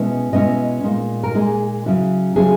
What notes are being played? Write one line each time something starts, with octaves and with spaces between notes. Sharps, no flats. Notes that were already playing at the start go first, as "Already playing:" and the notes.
Already playing: B2 G#3 C#4 E4
B2 G#3 C#4 E4 D#5
A#2 G#3 D#4
A#4
A#2 G#3 D#4 G#4
C#3 F#3 C#4 E4
C#3 F#3 C#4 E4 G#4